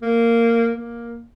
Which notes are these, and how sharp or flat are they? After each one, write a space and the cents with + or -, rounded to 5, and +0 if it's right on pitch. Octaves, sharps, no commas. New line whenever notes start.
A#3 -10
A#3 +10